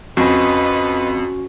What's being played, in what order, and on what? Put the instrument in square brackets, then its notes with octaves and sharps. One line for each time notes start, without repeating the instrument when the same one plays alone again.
[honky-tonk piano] F2 [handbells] C#4 F#4 [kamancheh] B4 D#5